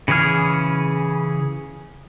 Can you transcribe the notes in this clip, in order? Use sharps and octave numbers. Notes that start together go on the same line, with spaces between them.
C#3 E3 C#4 G#4 F6